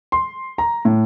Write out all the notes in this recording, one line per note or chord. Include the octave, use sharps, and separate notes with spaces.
C6
A#5
A2